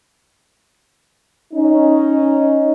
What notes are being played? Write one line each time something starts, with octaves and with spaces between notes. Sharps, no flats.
C#4 D#4